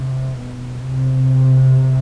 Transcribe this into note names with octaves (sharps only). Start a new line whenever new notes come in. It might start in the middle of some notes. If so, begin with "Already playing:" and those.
Already playing: C3
B2
C3